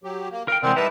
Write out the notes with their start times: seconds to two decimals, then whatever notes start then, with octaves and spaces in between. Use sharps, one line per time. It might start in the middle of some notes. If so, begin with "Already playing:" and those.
0.04 F#3 G4
0.31 A#3
0.48 A#4 F5 G5
0.63 C3 E3 G#3 C4 A#4 D5 F#5
0.76 G3 D#4 E4 B4 E5 A5